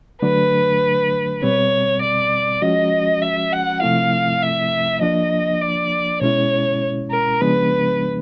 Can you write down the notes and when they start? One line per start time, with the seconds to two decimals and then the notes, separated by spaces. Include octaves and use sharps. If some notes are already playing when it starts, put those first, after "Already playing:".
0.22 D3 F#3 A3 D4 B4
1.42 B2 G3 C4 C#5
2.02 D5
2.62 F3 G#3 C#4 F#4 D#5
3.22 E5
3.53 F#5
3.82 C3 F3 A3 C4 E4 F5
4.42 E5
5.02 F3 A#3 D4 D#5
5.61 D5
6.22 B2 G#3 C#4 E4 C#5
7.11 A#4
7.41 C#3 F3 G#3 B3 D4 B4